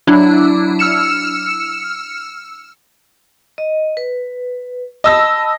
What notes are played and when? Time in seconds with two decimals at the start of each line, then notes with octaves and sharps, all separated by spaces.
0.07 F#3 D4 E4
0.79 E6 F6 C#7 E7
3.58 D#5
3.97 B4
5.04 D#5 A5 B5 E6 A#6